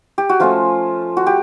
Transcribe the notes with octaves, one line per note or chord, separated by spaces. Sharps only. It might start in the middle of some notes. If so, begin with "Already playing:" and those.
G4
F#4
F3 A3 C#4 F4
F#4
G4